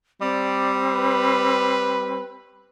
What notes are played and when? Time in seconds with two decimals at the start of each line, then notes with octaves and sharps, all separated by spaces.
0.21 G3 C4 D5
0.94 B4